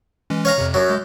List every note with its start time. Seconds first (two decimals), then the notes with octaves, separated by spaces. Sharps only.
0.30 E3 G#3 C#4
0.45 C#5 F5 A#5
0.58 F2 C3
0.74 F#2 F#3
0.88 G#3 G6